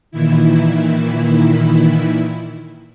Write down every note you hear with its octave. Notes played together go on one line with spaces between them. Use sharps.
A#2 D#3 E3 E4